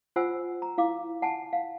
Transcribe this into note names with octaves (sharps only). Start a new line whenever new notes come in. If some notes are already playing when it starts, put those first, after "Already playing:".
F4 C5 F#5 G#5 E6
A#5
E4 F5 D6
F#5 G#5 A5
F5